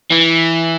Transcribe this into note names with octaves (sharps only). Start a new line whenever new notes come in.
E3